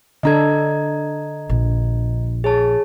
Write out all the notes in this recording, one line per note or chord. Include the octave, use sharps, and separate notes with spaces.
D3 D4 A4 D#5 A#5 G#6
A#1
G#4 C#5 A5